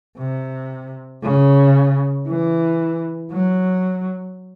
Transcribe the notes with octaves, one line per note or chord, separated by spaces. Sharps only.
C3
C#3
E3
F#3